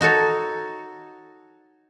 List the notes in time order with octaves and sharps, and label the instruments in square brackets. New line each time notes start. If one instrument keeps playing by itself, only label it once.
[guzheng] D#4 F#4 A4 C#5